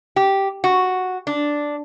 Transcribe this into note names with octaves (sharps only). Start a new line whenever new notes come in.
G4
F#4
D4